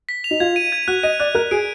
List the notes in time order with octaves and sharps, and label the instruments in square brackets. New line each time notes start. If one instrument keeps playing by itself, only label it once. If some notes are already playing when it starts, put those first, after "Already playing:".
[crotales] B6
F7
[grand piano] D#4
[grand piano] F4 [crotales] G#6
[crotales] D#7
G#6
[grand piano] F#4 [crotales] F#6
[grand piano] D#5 [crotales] D#7
[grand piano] D5 [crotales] F#6
[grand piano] A#4 [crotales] F#6
[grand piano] G#4 [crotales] D7